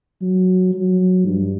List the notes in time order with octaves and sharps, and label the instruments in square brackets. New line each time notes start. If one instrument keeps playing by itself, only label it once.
[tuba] F#3
F#3
G2